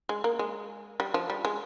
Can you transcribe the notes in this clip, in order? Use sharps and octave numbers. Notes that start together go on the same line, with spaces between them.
G#3
A#3
G#3
G3
F3
G3
G#3